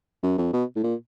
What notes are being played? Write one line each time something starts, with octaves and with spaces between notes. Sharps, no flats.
F#2
F2
B2
A2
A#2